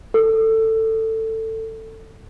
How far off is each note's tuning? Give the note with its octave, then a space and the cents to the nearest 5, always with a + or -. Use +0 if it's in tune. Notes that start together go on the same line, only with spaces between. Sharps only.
A4 +15